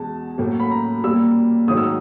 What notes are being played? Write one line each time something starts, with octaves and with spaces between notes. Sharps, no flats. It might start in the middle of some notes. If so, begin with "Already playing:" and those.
Already playing: E2 B2 G#3 A5
A2 F#3 A#3
B5
A#5
A#2 G3 A#3 E6
G#2 D#3 F#3 A3 D#6
E6